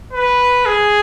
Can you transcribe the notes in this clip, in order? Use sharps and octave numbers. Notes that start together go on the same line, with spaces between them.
B4
G#4